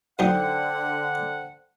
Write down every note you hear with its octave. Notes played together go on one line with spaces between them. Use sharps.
F#2 D3 F#3 D#4 C5 F#5 G5